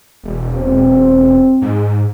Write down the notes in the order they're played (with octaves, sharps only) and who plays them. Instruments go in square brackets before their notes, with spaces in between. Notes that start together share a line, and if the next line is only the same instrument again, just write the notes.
[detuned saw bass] E1
[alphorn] C4
[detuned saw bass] G#2